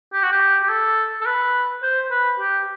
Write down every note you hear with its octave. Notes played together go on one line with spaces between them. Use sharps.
G4
F#4
G4
G4
A4
A4
B4
C5
B4
G4